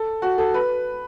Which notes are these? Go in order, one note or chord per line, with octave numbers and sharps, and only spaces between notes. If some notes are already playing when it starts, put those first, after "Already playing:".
Already playing: A4
F#4
A4
B4